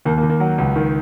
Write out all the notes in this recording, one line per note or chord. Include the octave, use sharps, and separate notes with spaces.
D#2 A#3
A#3
D#2
A#3
F#3
C#2
D#3